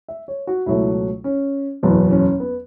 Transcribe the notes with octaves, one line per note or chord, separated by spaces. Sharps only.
E5
C#5
F#4
C#2 B2 F#3 A3 E4
C#4
F#1 E2 B2 B3
C#4
B3